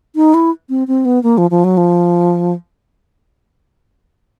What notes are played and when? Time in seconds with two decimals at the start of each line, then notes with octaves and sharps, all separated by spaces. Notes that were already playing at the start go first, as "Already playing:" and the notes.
0.16 D#4
0.34 E4
0.69 C4
0.88 C4
1.05 B3
1.23 A#3
1.38 F3
1.51 F3
1.64 F#3
1.77 F3